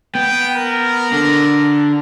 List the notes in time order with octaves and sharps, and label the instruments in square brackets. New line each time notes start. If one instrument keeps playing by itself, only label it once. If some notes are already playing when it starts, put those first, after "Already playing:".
[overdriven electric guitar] B3 [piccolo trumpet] G5
[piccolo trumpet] A#4
[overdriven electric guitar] D3